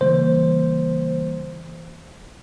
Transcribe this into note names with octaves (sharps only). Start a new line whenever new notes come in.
C#3 E3 G3 A#3 C5